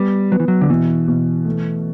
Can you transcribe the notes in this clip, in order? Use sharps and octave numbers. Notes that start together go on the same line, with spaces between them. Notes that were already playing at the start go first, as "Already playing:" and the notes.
Already playing: G3 B3
F#3 B3
E3
F#3
D3
B2 E3
B2
A3